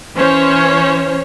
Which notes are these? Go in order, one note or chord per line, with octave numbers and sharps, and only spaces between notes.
E3 C#4 C5 C#5